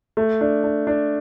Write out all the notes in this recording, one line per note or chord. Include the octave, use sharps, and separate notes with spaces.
A3
D4
D4
D4